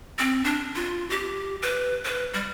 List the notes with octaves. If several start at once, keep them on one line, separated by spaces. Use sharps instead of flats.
C4
D4
F4
G4
B4
B4
G3